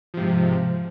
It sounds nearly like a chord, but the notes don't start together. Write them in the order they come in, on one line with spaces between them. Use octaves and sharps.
F3 C3 G#2